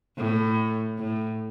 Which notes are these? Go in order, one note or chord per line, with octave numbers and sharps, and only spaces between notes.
A2
A2